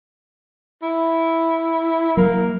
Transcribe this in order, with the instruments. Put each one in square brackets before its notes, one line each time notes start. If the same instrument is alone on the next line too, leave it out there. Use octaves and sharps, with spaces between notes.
[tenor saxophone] E4
[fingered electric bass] F#3 [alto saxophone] A#3 [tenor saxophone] A#4